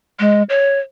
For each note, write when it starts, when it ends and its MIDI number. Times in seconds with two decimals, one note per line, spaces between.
0.20 0.43 56
0.49 0.80 73